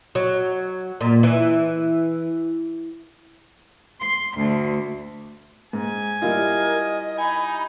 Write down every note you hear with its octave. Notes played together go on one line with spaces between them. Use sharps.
F#3
A#2
E3
C6
D2
G#2 G#5
G3 E4 F4 A#4 D#5
D#4 G#5 B5